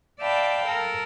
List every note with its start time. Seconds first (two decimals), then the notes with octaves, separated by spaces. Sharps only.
0.19 D5 E5 F5 G5 A5 B5
0.66 A4 A#4